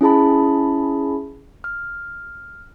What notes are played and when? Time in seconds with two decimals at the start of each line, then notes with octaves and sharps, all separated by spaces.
0.01 C#4 E4 G#4 A5 B5
1.64 F6